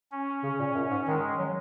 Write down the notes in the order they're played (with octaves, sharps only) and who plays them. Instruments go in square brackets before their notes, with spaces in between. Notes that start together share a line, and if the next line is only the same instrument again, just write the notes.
[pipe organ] C#4
[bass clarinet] C#3
A#2
F#2
G#2
[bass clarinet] D#3 [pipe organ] G#3
[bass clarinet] F#3